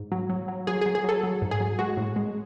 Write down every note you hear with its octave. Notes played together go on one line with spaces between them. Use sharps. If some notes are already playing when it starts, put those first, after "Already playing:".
Already playing: G#2
F#3
F#3
F#3
F#3 G#4
F#3 G#4
G#4
F#3 A4
F#3
G#2
G#4
F#3
G#3 F#4
A2
G#3